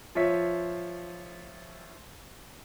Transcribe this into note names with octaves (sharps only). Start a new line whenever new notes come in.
F3 F4 C#5 E5 B6